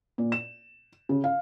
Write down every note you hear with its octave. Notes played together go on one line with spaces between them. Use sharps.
A#2
E7
C#3
F5